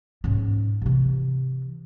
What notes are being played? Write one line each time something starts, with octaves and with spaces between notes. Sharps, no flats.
G#2 C#4
C3 E3